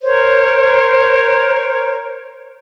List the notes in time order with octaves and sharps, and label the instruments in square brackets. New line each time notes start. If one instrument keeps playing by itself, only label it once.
[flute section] A#4 C5 C#5